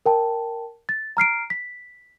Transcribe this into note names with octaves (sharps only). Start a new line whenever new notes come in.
A#4 G5 A5
A6
A#5 F6 C7 D7
B6